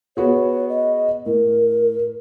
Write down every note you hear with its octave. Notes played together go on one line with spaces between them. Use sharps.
B3 F#4 G#4 C#5
D#5
A2 A#4